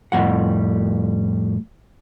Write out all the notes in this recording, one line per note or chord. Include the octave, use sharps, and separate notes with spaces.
F2 A2 F3 G3 F#5